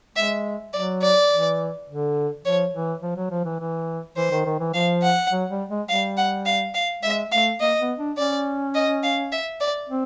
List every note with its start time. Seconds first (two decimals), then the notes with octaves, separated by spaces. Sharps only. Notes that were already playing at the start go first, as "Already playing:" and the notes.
0.16 G#3 E5
0.73 F#3 D5
1.02 D5
1.31 E3
1.88 D3
2.45 F3 C#5
2.74 E3
3.02 F3
3.16 F#3
3.31 F3
3.45 E3
3.60 E3
4.17 E3 C5
4.31 D#3
4.45 D#3
4.60 E3
4.74 F3 F5
5.03 F#5
5.31 F#3
5.50 G3
5.69 G#3
5.88 G3 F5
6.17 F#5
6.45 F5
6.74 F5
7.03 G#3 E5
7.31 A3 F5
7.60 A#3 D#5
7.80 B3
7.98 D4
8.17 C#4 D5
8.75 D#5
9.03 F5
9.32 E5
9.61 D5
9.89 C4